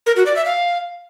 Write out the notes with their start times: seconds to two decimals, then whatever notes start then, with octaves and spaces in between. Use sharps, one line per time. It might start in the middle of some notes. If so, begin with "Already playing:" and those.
0.06 A#4
0.16 F#4
0.26 D5
0.36 E5
0.46 F5